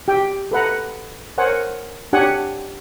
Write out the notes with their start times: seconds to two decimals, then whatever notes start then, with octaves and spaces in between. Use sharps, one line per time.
0.08 G4 G5
0.51 A4 B4 F#5 A#5
1.38 A#4 C5 C#5 F#5 G#5
2.13 D4 G4 C#5 F#5 G#5